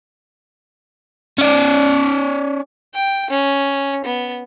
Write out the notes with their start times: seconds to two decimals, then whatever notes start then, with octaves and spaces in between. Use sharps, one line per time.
1.38 C#4 D5
2.95 G5
3.30 C#4
4.05 B3